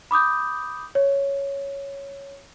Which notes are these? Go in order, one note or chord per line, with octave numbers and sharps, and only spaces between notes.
B5 D6 D#6 G6
C#5